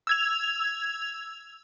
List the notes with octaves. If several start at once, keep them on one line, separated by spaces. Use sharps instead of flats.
E6 G#6 F7